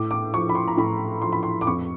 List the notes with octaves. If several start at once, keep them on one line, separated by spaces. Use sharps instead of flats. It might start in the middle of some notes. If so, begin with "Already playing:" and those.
Already playing: A2 D6
D6
F3 C#6
B5
C6
A#5
A2 B5
F3 C6
B5
C6
D6
F2 C#6